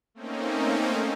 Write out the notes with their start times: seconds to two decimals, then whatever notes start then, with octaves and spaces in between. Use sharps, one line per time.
0.14 A3 A#3 C4 C#4 D#4